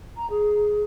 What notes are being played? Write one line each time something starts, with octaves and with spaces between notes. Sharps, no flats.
A#5
G#4